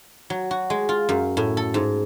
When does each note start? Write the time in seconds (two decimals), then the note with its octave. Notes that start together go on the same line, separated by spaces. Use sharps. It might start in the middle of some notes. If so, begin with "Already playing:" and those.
0.30 F#3
0.51 F#4
0.70 G#3
0.89 F4
1.09 F#2
1.37 A2
1.57 A4
1.74 G#2